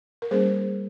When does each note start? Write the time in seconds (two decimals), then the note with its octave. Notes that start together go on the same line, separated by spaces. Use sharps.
0.22 A#4
0.31 G3 A#3 C#4 G#4 C5